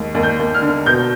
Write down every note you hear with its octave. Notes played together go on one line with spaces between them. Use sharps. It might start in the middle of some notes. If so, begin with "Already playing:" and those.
Already playing: D#2 G#3
D#2
G6
D#2
F6
D3
B2 G6